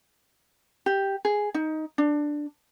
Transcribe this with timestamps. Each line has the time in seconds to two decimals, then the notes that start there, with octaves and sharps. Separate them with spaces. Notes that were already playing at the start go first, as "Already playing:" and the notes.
0.86 G4
1.25 G#4
1.54 D#4
1.98 D4